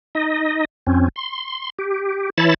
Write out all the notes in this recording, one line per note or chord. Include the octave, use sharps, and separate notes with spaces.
D#4 D#5
F2 C4 C#4
C6
G4
E3 E4 C#5 A5 B5 A6